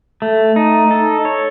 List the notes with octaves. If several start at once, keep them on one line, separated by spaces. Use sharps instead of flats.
A3
D#4
A4
C#5